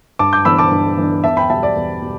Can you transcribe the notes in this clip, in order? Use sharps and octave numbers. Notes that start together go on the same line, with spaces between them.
G2 A5 D6
D6 G6
E3 B3 D4 B5 E6
A5 D6
G2
E3 B3 D4
E2 E5 A5
G5 B5
B2 G3 E5 A5
D5
E2
B2 G3